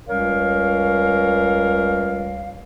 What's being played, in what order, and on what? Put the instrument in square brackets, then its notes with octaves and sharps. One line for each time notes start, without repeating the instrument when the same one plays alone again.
[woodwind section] C#2 G3 C#4 A#4 C#5 F5